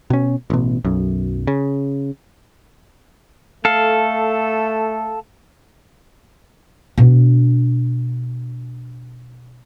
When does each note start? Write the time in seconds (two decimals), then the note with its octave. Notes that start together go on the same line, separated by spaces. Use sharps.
0.10 B2 C#4
0.50 A1 B2
0.85 B1 F#2
1.47 C#3
3.65 A3 A4 F5
6.98 B2 D4